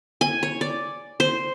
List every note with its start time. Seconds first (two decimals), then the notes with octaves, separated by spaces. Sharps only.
0.21 G#5
0.43 C#5
0.61 D5
1.20 C5